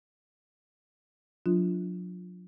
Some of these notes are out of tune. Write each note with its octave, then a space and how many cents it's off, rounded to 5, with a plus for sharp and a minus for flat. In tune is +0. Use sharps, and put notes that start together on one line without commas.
F#3 -35 D4 +0 F4 -10